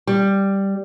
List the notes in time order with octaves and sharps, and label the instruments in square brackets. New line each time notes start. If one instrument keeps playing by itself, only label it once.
[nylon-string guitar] G3